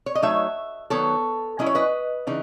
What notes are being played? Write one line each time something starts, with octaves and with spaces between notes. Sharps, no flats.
C#5
D#5
F#3 A3 D#4 C#5 E5
D#3 F#3 B3 A4 C#5
F#3 C#4 E4 D#5
C#5
B4 D#5
C#3 E3 D#4